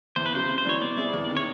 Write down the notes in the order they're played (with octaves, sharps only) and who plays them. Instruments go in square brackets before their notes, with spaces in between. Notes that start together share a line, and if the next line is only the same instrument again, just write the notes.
[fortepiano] E2 [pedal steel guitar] C5
[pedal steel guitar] B4
[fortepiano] C#3 F#3 [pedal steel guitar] C5
[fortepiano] C3
[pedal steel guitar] C5
[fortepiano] E3 G3 [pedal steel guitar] C#5
[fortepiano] B2 [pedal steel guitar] D5
[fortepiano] G3 C4 E4 G#4
E2
C3 D#3
[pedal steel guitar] C#5